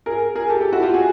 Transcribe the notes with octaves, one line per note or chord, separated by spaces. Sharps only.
G#4 A#4
G#4 A#4
G4 A4
G4 A4
E4 F#4
F4 G4
F#4 G#4